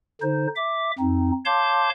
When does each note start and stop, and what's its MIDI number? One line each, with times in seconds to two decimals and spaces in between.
0.22 0.47 50
0.22 0.47 63
0.22 0.47 72
0.56 0.91 76
0.56 0.91 86
0.99 1.31 41
0.99 1.31 60
0.99 1.31 63
1.46 1.90 73
1.46 1.90 77
1.46 1.90 81
1.46 1.90 84
1.46 1.90 86
1.46 1.90 91